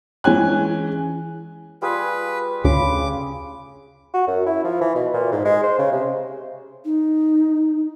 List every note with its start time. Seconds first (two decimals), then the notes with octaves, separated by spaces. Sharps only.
0.24 E3 G#3 C#4 G#5 F#6
1.82 G3 F4 G#4 B4
2.64 D2 C#3 B5 D6
4.14 F#4
4.27 F#2
4.46 E4
4.64 F3
4.81 E3
4.95 B2
5.14 A#2
5.32 G#2
5.45 G#3
5.63 C5
5.78 C#3
5.92 C3
6.85 D#4